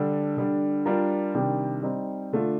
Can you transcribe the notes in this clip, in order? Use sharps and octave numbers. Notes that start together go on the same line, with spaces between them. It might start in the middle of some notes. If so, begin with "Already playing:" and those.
Already playing: D3 G3 D4 A4
D3 G3 D4
G3 D4 F4 A#4
C3 D#3 G3 D4 G4
G3 C4 D#4
D3 A3 D4 F4